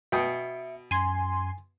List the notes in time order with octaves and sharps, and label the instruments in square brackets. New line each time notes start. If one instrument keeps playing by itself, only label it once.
[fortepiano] B2 G5 D#6 [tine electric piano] E5 C#7
[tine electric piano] F#2 [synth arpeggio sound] G#5 C6